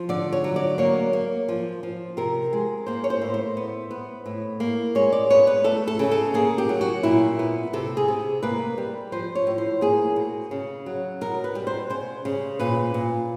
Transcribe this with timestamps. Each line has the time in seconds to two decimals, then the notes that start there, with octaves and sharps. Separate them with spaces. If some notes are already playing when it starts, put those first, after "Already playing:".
Already playing: F3
0.09 D3 D5
0.33 C#5
0.44 F#3
0.56 D5
0.78 A#3 C#5
1.13 A#3
1.49 F3
1.83 F3
2.17 C3 A#4
2.53 G#3
2.86 A#3 C5
3.04 C#5
3.10 C5
3.22 A2
3.34 C5
3.57 B3
3.91 B3
4.26 A2
4.60 A#3
4.95 G#3 C#5
5.13 D5
5.30 B3 C#5
5.47 B4
5.64 A3 A4
5.88 A4
5.99 C#3
6.11 A4
6.34 A#3 G#4
6.58 G4
6.69 F#3
6.81 F#4
7.03 A#2 E4
7.39 B3
7.73 C3 A4
7.97 G#4
8.08 C3
8.43 A#3 B4
8.78 G3
9.12 F3 C5
9.35 C#5
9.47 A2
9.58 C5
9.81 A#3 G#4
10.16 B2
10.51 C#3
10.86 F#3
11.21 B2 A#4
11.44 B4
11.55 G3
11.67 C5
11.90 C#3 C5
12.25 C#3
12.59 A#2 B4
12.94 A#2